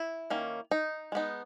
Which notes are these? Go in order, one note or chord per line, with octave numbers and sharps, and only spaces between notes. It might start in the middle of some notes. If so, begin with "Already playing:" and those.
Already playing: E4
D#3 A#3 C#4
D#4
G#3 B3 D#4